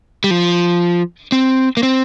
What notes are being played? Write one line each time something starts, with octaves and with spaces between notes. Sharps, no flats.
G3
F3
C4
A#3
C4